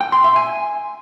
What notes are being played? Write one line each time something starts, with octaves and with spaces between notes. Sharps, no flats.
G5
C6
E5
G#5